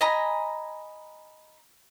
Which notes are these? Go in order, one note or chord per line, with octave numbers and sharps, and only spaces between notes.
D#5 G#5 A#5 B5